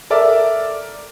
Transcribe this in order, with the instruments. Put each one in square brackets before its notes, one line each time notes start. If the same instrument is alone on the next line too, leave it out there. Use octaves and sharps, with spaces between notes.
[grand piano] A4 A#4 D5 E5